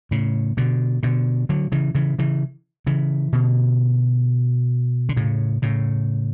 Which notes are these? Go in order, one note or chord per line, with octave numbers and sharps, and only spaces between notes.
A2 C#3
B2 D3
B2 D3
D3 F#3
C#3 E3
C#3 E3
C#3 E3
C#3 E3
B2 D3
D3
A2 C#3
A2 C#3